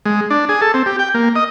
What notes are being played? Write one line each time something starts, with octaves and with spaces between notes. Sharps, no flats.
G#3
D4
G#4
A4
C4
G4
G5
A#3
D#5